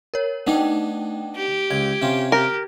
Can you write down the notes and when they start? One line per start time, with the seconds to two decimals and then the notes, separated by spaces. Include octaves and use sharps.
0.14 A#4 C#5
0.47 A3 B3 D4 D#4 D#5 G5
1.36 G4
1.71 C#2 G#6
2.02 C3 C#4 F4
2.32 G4 A#4